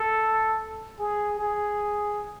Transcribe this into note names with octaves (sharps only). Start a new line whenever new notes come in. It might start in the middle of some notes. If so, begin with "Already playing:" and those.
Already playing: A4
G#4
G#4